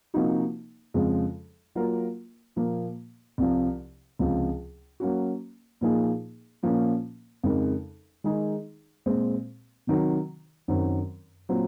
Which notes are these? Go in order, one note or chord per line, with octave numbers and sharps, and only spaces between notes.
C3 F3 A#3 D#4 F#4
F2 C#3 F3 G#3
F#3 A#3 F4 A#4
A#2 F3 A#3
C2 C3 F3
C#2 C3 F3
F#3 A#3 C#4 F#4
A#2 F3 A#3 D#4 G#4
A#2 F3 A#3 C#4
F2 C#3 G#3 D#4 A#4
D#3 G#3 D#4 G#4 D#5
A#2 G#3 C4
C3 D#3 F#3
F#2 D#3 F#3 C4
A#2 F#3 C4 F4